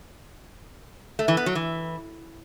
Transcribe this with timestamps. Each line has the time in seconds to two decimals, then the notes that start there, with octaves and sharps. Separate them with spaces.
1.19 A3
1.28 E3
1.37 B3
1.46 F#3
1.55 E3